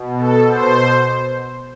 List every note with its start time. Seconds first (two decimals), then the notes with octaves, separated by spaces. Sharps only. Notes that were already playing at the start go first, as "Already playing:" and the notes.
Already playing: B2
0.19 A4
0.48 C5